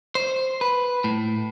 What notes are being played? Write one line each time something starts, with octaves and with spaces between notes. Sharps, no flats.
C5
B4
A2